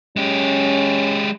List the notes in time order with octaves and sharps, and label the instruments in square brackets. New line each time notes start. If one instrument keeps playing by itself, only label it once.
[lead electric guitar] G#3 G4 [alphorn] C#4